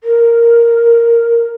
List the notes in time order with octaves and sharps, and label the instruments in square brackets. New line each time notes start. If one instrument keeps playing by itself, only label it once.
[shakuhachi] A#4